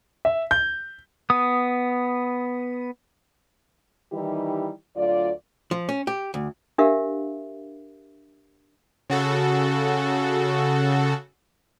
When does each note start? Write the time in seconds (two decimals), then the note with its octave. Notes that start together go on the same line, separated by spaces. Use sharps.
0.25 E5
0.51 G6
1.30 B3 D#6
4.12 D#3 E3 G3 D#4 E4 G4
4.96 D2 F#3 F4 D5
5.71 F3
5.89 C#4
6.07 G4
6.34 D2
6.78 D4 G4 A#4 E5 F5
9.10 C#3 F#4 A4